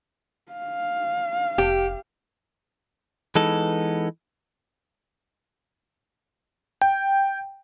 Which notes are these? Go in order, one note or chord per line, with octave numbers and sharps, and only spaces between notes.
F5
F1 G4
E3 G#3 B3 D#4 A4
G5